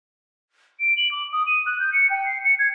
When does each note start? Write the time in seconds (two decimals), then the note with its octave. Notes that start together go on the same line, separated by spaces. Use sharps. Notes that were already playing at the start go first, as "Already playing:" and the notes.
0.80 D7
0.97 F#7
1.12 D6
1.32 D#6
1.47 D#7
1.66 F#6
1.80 G6
1.93 C#7
2.10 G5
2.26 C7
2.45 C#7
2.59 G#6